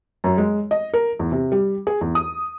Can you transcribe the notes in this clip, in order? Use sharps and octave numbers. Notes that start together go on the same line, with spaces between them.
F#2
G#3
D#5
A#4
E2
C3
G3
G#4
E2
D#6